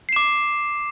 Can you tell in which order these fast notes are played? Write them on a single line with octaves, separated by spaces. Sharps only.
C7 E7 D6